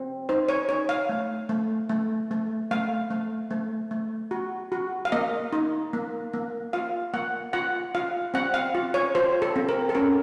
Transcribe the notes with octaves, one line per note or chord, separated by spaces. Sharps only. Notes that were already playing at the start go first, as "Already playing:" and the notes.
Already playing: C4
D#4 C5
C#5
D#4 C#5
F5
A3
A3
A3
A3
A3 F5
A3
A3
A3
F#4
F#4
F5
A#3 D#5
D#4
A#3
A#3
F4 F5
A#3 F#5
F4 F#5
F4 F5
C4 F#5
F5
F4
C#5
F4 C5
A4
C4
A#4
A4
C#4 A#4